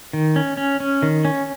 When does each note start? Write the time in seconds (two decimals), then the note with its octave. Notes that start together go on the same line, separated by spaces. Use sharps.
0.13 D#3
0.36 C#4
0.57 C#4
0.80 C#4
1.03 D#3
1.25 C#4